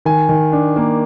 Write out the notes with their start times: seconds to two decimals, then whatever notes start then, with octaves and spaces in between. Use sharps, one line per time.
0.05 D#3 G#5
0.29 D#3
0.52 D4
0.76 A#3